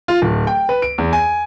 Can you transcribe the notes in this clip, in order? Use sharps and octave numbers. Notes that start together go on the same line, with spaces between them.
F4
D1
G5
B4
D7
E2
G#5